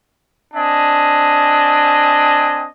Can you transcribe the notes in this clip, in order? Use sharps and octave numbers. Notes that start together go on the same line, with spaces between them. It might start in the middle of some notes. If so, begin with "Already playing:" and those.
C4 D4 D#5 G#5